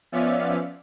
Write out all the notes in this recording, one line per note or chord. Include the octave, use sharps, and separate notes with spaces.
F3 B3 C#4 D5 E5 F5